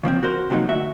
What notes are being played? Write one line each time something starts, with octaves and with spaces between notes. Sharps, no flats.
C#3 F3 A#3 C4
F#4 A#4 C5
C3 F3 F#3 A#3 D#4
D2 F#4 E5